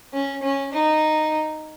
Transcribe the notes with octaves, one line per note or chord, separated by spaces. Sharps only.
C#4
C#4
D#4